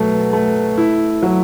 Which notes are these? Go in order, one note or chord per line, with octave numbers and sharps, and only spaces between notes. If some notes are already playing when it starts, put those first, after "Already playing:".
Already playing: B2 F#3 A3
A3
E4
F#3